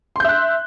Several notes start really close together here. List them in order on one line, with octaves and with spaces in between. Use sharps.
C6 G6 E5 F#6